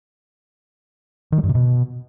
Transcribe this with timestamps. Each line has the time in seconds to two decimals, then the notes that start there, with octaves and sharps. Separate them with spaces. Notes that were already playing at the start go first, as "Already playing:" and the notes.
1.32 D#3
1.38 G3
1.44 G2
1.49 C3
1.55 B2